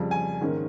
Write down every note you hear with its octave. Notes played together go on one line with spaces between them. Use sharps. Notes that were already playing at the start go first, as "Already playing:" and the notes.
Already playing: F2 C#3 G3
G#5
G#2 D#3 A#3 C#4